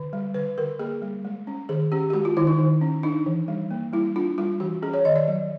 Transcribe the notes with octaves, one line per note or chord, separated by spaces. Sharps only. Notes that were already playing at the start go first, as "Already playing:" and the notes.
Already playing: D3
G3
D3 B4
D3 A#4
A#3 G#4
G3
G#3
C#4
D#3 G#4
C#4 G4
G4
G#3 F#4
F4
D#3 E4
D#4
D#3
C#4
D4 D#4
E3
G3
A#3
G3 E4
D4 F4
G3 F4
E3 F#4
C#4 G#4
C#5
D#3 D#5
D5
F#3